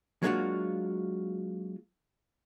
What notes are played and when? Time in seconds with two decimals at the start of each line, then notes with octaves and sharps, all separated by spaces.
0.23 F#3 G#3 A#3 D4 F4 F#4